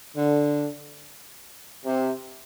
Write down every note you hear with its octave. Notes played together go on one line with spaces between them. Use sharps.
D3
C3